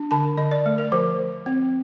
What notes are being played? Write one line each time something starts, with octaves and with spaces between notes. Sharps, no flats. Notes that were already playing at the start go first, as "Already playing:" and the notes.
Already playing: D4
D3 A5
D3 D#5
D5
A3
A#4
F3 C5
F3
C4